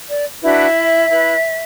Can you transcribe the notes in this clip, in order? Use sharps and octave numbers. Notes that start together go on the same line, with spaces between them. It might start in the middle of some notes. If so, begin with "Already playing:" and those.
D5
D4 E4 F#4 B4 E5
E4 B4